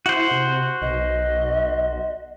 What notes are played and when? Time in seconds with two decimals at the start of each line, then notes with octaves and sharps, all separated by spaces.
0.06 E4 F#4 C5
0.31 C3
0.82 B1 D#5